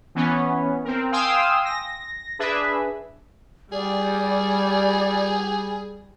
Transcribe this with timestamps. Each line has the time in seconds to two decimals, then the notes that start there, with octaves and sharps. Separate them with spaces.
0.15 E3 B3 C#4
0.84 C4 A#4
1.12 F5 G5 G#5 C6 D#6 E6
1.65 A#6
2.39 D4 G#4 B4 E5
3.72 G3 G#4 D5